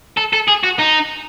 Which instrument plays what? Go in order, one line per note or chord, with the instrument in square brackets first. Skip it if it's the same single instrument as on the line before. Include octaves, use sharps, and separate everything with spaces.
[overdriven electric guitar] A4
A4
G#4
F#4
D#4